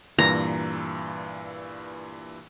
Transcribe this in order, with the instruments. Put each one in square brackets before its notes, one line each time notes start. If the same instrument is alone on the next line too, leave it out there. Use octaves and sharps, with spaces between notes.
[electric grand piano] G2 A#2 E3 [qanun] A#5